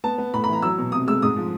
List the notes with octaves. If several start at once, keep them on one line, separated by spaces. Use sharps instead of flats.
B3 A5
B3
A2 B5
B5
E3 A#5
F#3 E6
B2
C3 D#6
G#3 E6
G#2 D#6
F3